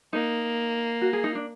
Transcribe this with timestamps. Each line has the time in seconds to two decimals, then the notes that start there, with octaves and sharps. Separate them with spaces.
0.13 A#3 D#4
1.01 F#4
1.13 G#4
1.24 D#4
1.35 D4